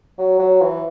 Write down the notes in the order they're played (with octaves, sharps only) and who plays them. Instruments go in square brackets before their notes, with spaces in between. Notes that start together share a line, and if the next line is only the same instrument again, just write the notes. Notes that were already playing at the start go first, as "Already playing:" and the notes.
[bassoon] F#3
F#3
E3